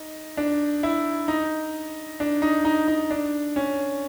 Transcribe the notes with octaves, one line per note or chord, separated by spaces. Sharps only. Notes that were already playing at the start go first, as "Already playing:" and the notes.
Already playing: D#4
D4
E4
D#4
D4
D#4
D#4
D#4
D4
C#4